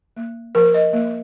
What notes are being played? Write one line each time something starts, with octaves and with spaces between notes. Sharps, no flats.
A#3
F3 A#4
D#5
A#3